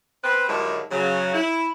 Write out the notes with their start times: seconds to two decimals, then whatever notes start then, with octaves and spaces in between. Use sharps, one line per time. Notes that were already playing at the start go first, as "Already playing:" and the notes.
0.23 C4 B4
0.48 G2 D3 D#3 F#3 G#3 E4
0.91 C#3 F#3
1.34 E4